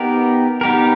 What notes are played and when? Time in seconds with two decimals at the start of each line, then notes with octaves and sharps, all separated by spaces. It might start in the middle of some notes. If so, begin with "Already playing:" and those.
Already playing: B3 D#4 G4 A#4
0.61 B3 D#4 G4 A#4